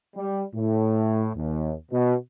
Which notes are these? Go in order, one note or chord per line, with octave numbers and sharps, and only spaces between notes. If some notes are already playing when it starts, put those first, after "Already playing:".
G3
A2
D#2
B2